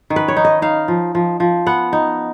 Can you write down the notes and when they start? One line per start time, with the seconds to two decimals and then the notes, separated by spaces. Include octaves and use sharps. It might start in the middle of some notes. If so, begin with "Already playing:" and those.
0.10 D#3
0.16 B4
0.28 C#5
0.37 D#4
0.45 D#5
0.62 D#4 F5
0.88 F3
1.15 F3
1.40 F3
1.66 B3 F#5
1.93 D#4